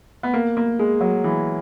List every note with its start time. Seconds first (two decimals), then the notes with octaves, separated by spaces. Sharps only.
0.23 B3
0.34 A#3
0.57 A#3
0.79 G#3
1.01 F#3
1.24 E3